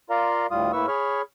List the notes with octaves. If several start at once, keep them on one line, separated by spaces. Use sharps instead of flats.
F4 A#4 D5 F5 A#5 C6
D2 A2 G3 F4 F5 D#6
A2 A#3 E4 B4 C#6 E6
G#4 C#5 B5 C#6 F6